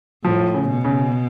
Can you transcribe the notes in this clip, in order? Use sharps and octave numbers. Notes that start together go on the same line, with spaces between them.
A2 F3
C#3
B2
C#3